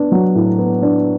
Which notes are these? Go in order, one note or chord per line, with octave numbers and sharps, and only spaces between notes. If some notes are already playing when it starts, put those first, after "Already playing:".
Already playing: B3 D4
F#3
A2
B3
D4